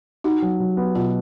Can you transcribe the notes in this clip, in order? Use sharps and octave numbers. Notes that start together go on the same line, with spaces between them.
D#4 F#4
F#3
F#3
B3
B2 F4